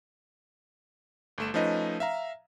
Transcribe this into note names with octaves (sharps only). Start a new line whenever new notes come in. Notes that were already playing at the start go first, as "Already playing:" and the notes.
G1 A3 E7
F3 A3 C#4 D#4 B4 D#5
E5 F5 A#5